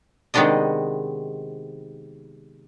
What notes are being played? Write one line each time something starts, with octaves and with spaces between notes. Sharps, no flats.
C3 D#3 G#3 B3 D4 D#5